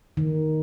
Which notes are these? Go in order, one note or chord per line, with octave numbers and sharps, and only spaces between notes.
D#3